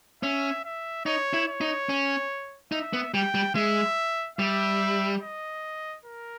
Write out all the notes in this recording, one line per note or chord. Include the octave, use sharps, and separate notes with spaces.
C#4 E5
E5
D#4 C#5
E4
C#5
D#4
C#4
D#4 E5
B3
G3 G5
G3
G#3 E5
G3 E5
D#5
A#4